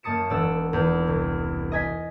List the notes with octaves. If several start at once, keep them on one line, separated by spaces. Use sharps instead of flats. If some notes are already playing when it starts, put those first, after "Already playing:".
F#2 A#3 A5 D#6 C#7 E7
E1 D5 F#5 E6
E2
C2
D#5 G#5 B6